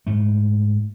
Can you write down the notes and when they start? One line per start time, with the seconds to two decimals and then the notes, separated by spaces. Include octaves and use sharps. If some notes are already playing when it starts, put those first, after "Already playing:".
0.07 G#2 A3